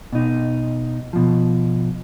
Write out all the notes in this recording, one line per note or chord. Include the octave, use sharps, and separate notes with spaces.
B2 D#4
B2 F3